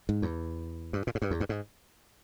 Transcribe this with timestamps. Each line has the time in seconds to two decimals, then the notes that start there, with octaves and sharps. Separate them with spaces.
0.09 G#2
0.22 E2
0.93 G2
1.07 A#2
1.15 G#2
1.22 G2
1.31 E2
1.40 G2
1.49 G#2